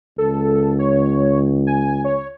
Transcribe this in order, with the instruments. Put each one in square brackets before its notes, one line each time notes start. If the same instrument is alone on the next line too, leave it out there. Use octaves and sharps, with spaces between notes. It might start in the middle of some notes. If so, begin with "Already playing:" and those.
[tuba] C#2 [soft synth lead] A4
[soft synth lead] C#5
G#5
C#5